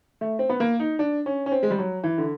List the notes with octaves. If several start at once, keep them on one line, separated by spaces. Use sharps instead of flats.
A3
C4
B3
A#3
D#4
D4
C#4
C#4
C4
G#3
G3
F#3
E3
D3